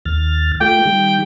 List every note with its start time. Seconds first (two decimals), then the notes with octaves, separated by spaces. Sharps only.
0.05 D#2 F6 A6
0.61 A3 F4 G5
0.85 D#3 G3